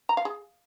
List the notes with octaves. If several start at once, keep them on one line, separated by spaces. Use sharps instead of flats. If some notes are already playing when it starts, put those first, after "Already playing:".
A#5
F5
G#4